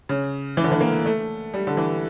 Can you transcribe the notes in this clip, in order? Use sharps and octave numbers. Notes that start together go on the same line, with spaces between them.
C#3
E3
D3
E3
A#3
A3
G3
D3
E3